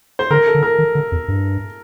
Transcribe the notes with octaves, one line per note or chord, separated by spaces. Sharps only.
C5
D3 A#4
A4
D3
A#4
D#3
D3
F2
G2